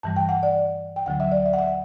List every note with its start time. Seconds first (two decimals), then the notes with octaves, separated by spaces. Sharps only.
0.03 G2 E3 G3 A5
0.16 G5
0.29 F#5
0.43 D5
0.96 G5
1.06 D2 D3 F#3 F#5
1.20 E5
1.32 D5
1.46 E5
1.53 F#5
1.58 E5